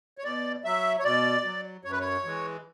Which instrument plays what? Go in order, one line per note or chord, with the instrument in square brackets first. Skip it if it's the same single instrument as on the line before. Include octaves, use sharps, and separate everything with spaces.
[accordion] C#5
B2 D5
F#3 E5
C#5
B2 D5
F#3
F#2 C#5
B4
C#5
E3 G#3